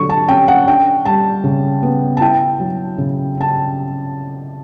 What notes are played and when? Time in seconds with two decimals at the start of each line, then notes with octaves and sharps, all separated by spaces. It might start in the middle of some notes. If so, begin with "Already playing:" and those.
Already playing: D3 F#3 C#6
0.09 A5
0.28 C#4 G5
0.48 F#5
0.67 D4 G5
1.05 G3 A5
1.44 C#3
1.83 B3
2.17 A5
2.21 E4 G5
2.60 F#3
2.98 C#3
3.37 C#4 A5